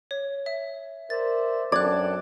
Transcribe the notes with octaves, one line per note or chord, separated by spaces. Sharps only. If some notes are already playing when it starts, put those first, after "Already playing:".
C#5
E5
A#4 C5 D5 E5 A6
F#2 C4 D4 A4 D5 F#6 G#6